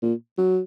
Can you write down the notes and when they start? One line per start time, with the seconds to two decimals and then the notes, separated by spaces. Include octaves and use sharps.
0.02 A#2
0.38 F#3